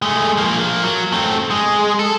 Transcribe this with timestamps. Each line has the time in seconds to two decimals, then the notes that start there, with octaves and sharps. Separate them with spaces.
0.02 G#3 A3
0.37 F3 A#3
0.83 F#3
1.12 A3 C4
1.51 G#3
1.99 A4